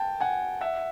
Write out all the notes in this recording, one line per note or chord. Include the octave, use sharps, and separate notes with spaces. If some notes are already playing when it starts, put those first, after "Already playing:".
Already playing: G5 A5
F#5 G#5
E5 F#5